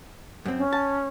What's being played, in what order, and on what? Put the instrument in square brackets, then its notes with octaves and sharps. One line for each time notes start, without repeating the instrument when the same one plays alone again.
[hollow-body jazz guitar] F#2 C4
[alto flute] C#4
[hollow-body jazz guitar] A5